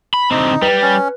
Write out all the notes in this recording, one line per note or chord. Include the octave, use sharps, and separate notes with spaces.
B5
D3 C4 D#4
G3 B4
C#4